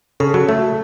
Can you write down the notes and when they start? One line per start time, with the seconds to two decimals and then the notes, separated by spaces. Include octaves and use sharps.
0.20 C#3 A4
0.34 F#3
0.49 A3